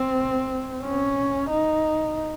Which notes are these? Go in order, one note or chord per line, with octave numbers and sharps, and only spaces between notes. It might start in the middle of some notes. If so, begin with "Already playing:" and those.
Already playing: C4
C#4
D#4